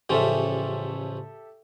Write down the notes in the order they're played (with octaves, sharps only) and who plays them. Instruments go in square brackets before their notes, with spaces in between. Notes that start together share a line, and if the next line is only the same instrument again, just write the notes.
[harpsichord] A1 C#3 F3 [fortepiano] G4 A4 E5